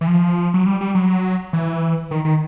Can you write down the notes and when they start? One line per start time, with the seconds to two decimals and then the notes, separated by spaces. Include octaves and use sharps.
0.01 E3
0.07 F3
0.54 F#3
0.66 G3
0.81 G3
0.95 F#3
1.53 E3
2.11 D#3
2.25 D#3